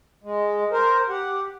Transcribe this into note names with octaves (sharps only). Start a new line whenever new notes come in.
G#3
A#4 C5
G4 F#5